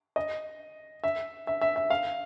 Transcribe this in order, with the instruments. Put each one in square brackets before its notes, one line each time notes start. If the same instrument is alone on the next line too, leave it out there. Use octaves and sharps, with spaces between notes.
[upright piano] D#5
E5
E5
E5
E5
F5